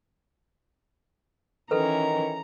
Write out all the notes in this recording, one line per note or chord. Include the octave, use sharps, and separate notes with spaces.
D#3 E3 C#4 A4 B4 A#5